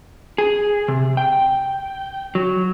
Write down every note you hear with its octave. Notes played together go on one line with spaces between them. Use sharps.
G#4
C3
G5
F#3